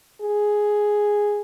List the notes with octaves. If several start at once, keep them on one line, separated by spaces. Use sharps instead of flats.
G#4